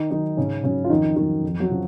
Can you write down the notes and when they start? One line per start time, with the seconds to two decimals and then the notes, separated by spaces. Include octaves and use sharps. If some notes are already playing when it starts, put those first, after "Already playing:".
Already playing: D#3 D#4
0.10 D#3 F#3 D#4
0.37 G#2 C#3 C#4
0.63 C#3 F#3 C#4
0.84 F4
0.90 F2 D#3 D#4
1.16 D#3 F#3 D#4
1.44 F2
1.60 F#3 F#4
1.70 C#3 F3